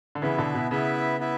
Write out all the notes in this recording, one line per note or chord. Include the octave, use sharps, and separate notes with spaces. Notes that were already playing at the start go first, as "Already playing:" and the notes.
D3
C#3 E3 B3 E4 B4 E5
B2 D3
B2
C#3 B3 E4 B4 E5
B3 E4 B4 E5